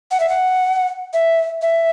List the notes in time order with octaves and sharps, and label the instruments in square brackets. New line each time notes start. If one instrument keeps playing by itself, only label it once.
[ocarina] F#5
E5
F#5
E5
E5